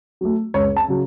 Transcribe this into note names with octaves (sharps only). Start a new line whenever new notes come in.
F#3 A3
C#2 C#5
A5
C#3 F#3